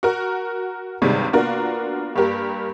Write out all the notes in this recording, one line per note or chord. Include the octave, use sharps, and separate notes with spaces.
F#4 A#4
B1 G2 C3 D#3 G3 G#3
A#3 B3 D4 F4 F#4 A#4
G2 A#3 G4 A#4